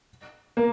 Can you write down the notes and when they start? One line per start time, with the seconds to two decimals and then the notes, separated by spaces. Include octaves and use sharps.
0.57 A#3